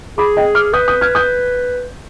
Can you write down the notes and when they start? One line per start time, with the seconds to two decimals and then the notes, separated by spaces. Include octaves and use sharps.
0.18 G#4 B5 D6
0.37 D#5 G5
0.55 D6 F6
0.73 B4 D#6 G6
0.88 D#6 G6
1.01 F6 G#6
1.15 D#6 G6